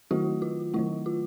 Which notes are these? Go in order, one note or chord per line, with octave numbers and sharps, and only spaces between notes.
D#3 F#3 A3 E4 F#4
F4
D#3 F#3 A3 E4
F4